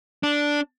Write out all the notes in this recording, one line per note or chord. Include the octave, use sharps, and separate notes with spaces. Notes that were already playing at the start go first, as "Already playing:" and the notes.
D4